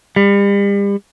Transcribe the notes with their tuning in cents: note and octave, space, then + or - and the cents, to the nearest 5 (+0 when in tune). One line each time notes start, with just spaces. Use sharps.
G3 +40